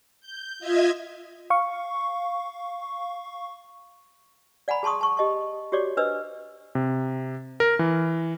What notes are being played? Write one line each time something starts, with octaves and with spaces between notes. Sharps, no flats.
G6
F4 D#5 E5 G#6
F5 C#6
D5 F#5 G#5 A#5 B5
G#4 A5 C6 C#6 D#6
A5 C#6
G4 D#5 A5 C#6
F#4 G4 C#5 D5 D6
D4 B4 C5 D#5 E6
C3
A#4
E3